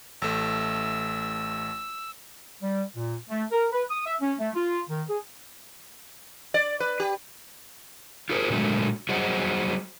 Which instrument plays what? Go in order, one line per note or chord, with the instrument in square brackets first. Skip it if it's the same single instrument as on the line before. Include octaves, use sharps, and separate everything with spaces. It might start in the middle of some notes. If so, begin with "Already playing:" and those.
[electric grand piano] A1 A3 [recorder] E6
[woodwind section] G3
A#2
A3
A#4
B4
D#6
E5
C#4
A3
F4
D#3
G#4
[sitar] D5
B4
G4
[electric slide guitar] F4 G4 G#4 A#4 C5
A#2 D3 F3 F#3 G#3 A3
F#3 G3 G#4 C5 D#5 F#5